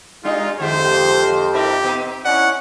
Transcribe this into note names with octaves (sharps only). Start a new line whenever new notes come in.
G3 G#3 D4 D#4 F4
F2 D3 G#3 G4 C5
D#4 G4 A4 A#4
C3 B3 D#4
C#4 D#4 E4 D5 F#5